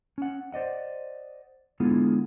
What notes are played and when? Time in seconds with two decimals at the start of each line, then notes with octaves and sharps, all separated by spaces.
0.18 C#4 F#5
0.52 C5 D5 D#5 F#5
1.80 D3 G#3 B3 E4 F4 G#4